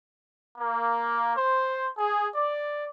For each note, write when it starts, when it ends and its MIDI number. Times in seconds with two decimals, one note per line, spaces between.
0.58 1.35 58
1.36 1.89 72
1.98 2.28 68
2.34 2.88 74